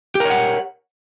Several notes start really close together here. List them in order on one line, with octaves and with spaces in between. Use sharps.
G4 A#4 C#5 F#5